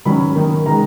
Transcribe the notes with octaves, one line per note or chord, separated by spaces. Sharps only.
D#3 F#3 C#4 B5
D#3 A#3 D#4
D#3 G#3 A#5